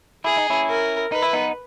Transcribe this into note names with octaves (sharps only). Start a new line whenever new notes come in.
E4 G#4
D#4
C#4 E4
A#4
D#4 B4
E4
B3 D#4